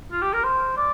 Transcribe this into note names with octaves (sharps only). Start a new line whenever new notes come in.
F4
G4
A#4
C5
D5